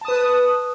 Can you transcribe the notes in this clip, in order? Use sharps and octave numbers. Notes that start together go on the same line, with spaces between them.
B4 A5 D#6